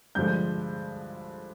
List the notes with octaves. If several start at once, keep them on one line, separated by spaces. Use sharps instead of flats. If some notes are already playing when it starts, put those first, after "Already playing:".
G2 D3 F3 G#3 G6